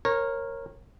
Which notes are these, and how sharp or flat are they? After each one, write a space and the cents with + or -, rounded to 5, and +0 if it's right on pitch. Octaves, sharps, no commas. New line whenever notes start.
A#4 +0 C#5 -25